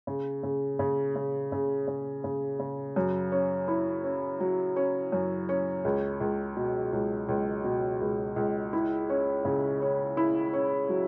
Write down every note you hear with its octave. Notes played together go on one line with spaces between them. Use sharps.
C#3
C#3
C#3
C#3
C#3
C#3
C#3
C#3
F#2
C#4
E4
C#4
F#3
C#4
F#2
C#4
C#2
C#2
B2
C#2
C#2
B2
C#2
C#2
E4
C#4
C#3
C#4
E4
C#4
F#3